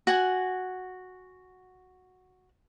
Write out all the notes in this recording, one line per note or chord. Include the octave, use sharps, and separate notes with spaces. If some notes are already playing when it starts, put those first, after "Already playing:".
F#4 F#5 G#5